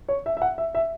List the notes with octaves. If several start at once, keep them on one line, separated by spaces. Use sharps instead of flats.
C#5
E5
E5
F#5
E5
E5